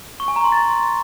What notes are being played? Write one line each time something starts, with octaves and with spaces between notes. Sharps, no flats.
C#6
G#5
A#5
C6
A6